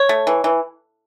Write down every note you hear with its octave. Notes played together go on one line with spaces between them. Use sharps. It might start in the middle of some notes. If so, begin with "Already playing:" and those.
Already playing: C#5
A3
E3
E3